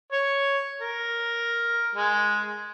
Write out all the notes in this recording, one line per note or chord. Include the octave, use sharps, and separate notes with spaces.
C#5
A#4
G#3